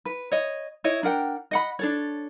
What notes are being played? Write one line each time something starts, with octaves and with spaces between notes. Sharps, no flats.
B4
C#5 D#5
E4 C#5 D#5
D4 A#4 F#5 G5
D#5 F#5 B5
D4 A4 C#5